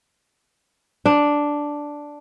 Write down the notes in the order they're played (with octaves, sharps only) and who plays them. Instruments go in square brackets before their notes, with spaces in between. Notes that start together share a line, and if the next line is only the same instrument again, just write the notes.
[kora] D4